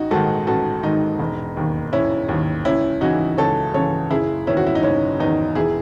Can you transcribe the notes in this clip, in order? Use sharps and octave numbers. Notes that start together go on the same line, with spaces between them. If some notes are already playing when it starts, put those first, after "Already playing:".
Already playing: A1 D#4 F#4
G#2 D#3 F#4 A4
A1 F#4 A4
G#2 D#3 D#4
E1
D#2 D#3
E1 C#4 E4
D#2 D#3
C#2 C#4 E4
C#3 E3 D#4 F#4
C#2 A4 C#5
C#3 E3 A4 C#5
F#1 E4 G#4
E2 D#3 C#4 E4
F#4
E4
D#4
F#1 C#4
E2 D#3 D#4
E1 E4 G#4